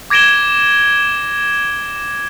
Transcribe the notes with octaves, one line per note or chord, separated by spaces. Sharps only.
D6 G#6 A#6 D7 E7 G7